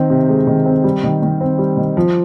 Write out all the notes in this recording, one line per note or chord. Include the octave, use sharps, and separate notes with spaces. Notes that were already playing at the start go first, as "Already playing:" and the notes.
Already playing: D#3 C4
C3
G#3
D#3
C4
G3
D#3
D#3
C4
G3
D#3
F3